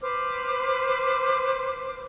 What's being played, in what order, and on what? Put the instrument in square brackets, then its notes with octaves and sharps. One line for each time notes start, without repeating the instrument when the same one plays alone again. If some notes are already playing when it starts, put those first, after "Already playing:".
[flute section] B4 C5 D6 F6